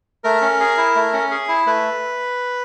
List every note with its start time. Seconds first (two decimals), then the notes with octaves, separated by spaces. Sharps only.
0.24 A3 A#4
0.41 C#4
0.60 G#4
0.78 E4
0.96 A3
1.13 C#4
1.31 G#4
1.48 E4
1.66 A3 B4